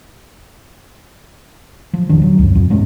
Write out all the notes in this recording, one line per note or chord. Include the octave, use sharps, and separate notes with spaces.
F3
E1 D#3 D4
F#3
C#2 F#2
F2
G#2 G#3 B3 C#4